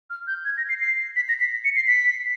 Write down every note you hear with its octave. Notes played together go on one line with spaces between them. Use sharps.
F6
G6
G#6
A#6
C7
C7
B6
A#6
B6
C#7
C7
B6